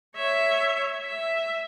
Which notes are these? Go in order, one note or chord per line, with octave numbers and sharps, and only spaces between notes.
C#5 E5
E5